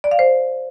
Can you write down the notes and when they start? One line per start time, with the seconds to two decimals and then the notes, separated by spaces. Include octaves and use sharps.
0.04 D5
0.11 F5
0.19 C5